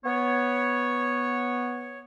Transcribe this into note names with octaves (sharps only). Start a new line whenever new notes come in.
B3 C#5